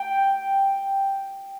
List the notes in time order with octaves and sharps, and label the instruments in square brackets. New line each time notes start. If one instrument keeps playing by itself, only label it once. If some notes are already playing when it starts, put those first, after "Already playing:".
Already playing: [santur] G5